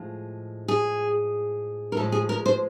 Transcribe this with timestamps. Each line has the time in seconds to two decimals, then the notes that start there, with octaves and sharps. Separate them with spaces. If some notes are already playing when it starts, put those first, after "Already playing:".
Already playing: A2 F3 G#3
0.68 G#4
1.92 A#4
1.97 A2 F3 G#3 A4
2.12 G#4
2.29 A#4
2.46 C5